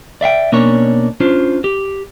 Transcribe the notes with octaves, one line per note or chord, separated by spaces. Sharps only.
D5 E5 F5 G5
B2 A#3 C#4 D4 C#5
C#4 D4 F4 C5
G4